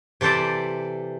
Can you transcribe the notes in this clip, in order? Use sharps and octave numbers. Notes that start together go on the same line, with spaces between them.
C3 E3 A4 C5 D5